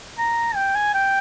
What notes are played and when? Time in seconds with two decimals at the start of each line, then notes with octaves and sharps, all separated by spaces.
0.18 A#5
0.55 G5
0.75 G#5
0.94 G5